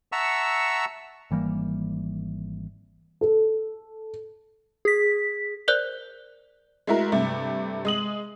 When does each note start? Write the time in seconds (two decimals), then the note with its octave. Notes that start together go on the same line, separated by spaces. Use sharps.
0.12 E5 F#5 A5 A#5 C#6 E6
1.31 G#1 E3 G3 A#3
3.21 A4
4.85 G#4 B6
5.68 A#4 C5 D5 F#6 G6
6.87 G#3 A3 E4 F#4 A#4
7.12 G2 C3 A3
7.85 G#3 D#6 F#7